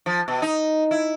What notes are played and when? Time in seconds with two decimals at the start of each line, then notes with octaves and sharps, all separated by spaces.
0.06 F3
0.28 B2
0.42 D#4
0.91 E4